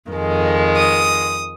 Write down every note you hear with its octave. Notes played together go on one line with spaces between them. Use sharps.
F2 D#3 G#3
D#6